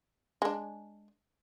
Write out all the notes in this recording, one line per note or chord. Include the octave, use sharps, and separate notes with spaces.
G#3 D4